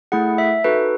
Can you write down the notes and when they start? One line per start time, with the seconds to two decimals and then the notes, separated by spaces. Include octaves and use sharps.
0.12 A3 E4 G#4 F#5
0.38 E5
0.64 D#4 F#4 A4 B4